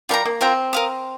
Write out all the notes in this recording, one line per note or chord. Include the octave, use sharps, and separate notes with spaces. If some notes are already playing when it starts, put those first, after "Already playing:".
G3 F4 A#4 G5 A#5
A#3
C4 F4 A#4 G5 A#5
A#4 F5 D#6